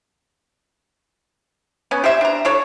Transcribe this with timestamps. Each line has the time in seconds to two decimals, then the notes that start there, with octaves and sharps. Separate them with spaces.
1.91 B3 C#4
2.04 G4 C5 E5
2.21 D4 A#5
2.45 D4 A4 C#5